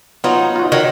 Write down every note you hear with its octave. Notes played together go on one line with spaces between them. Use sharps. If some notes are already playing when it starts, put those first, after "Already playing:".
F#3 B3 D#4 F4
F4 F#4
D#3 F#4 C#5